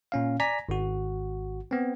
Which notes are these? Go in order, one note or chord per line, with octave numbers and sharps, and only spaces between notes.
A#2 C#4 F5
D5 G#5 A#5 B6
G#1 F#4
B3 C4